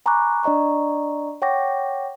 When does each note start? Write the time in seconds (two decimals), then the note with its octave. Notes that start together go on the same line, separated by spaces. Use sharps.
0.06 G#5 A#5 B5 C#6 D6 F#6
0.43 D4 D5 D#5 A#5 C#6
1.42 C#5 F#5 G5 C#6 D6 A#6